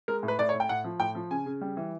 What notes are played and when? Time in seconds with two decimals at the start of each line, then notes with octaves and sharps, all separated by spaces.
0.08 G#3 A#4
0.23 A2
0.28 B4
0.39 A2 D5
0.49 C#5
0.54 A2
0.60 G5
0.69 A2 F#5
0.84 F3
1.00 A2 G5
1.15 F3
1.31 C#3 G#5
1.46 C#3
1.61 G3
1.77 E3